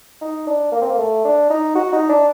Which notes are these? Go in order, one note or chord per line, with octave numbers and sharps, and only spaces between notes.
D#4
D4
A#3
C4
A#3
A3
D4
D#4
F#4
D#4
D4